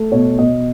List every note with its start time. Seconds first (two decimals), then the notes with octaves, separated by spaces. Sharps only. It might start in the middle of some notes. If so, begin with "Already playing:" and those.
Already playing: A3
0.12 B2 C#5
0.39 B2 D#5